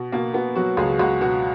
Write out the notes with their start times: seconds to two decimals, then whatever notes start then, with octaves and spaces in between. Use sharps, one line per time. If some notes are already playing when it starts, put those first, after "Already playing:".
Already playing: B2
0.12 B2 A#3
0.34 B2 B3
0.56 F#3 F#4
0.77 C#2 G#4
0.99 C#2 F#4
1.21 B2 F#4